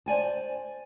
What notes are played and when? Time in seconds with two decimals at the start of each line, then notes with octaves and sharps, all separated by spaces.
0.06 C5 D5 G#5 A5